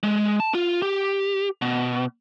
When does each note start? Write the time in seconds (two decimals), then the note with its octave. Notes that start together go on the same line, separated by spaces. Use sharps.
0.03 G#3
0.40 A5
0.55 F4
0.82 G4
1.62 B2